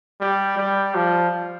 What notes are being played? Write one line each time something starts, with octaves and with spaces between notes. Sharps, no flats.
G3
G3
F3